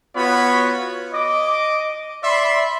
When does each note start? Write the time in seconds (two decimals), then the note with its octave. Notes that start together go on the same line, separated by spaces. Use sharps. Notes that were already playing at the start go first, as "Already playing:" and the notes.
0.15 B3 F4 F#4 C#5 B5
1.13 D#5 D6
2.23 D5 E5 B5 C6